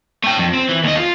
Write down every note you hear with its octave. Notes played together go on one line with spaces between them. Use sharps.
A3 G5
F2
C4
E3
D#2 D#5
F4